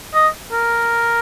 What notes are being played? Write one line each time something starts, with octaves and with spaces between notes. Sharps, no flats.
D#5
A#4